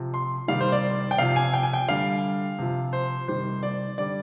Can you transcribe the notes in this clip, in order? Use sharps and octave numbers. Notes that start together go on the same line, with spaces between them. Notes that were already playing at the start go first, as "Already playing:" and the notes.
Already playing: C3 F3
C6
C3 D#3 G3 F5
C5
D5
G5
C3 F3 F5
G#5
G5
G#5
G5
D3 G3 F5
C3 F3
C5
C3 D#3 G3 C5
D5
D3 G3 D5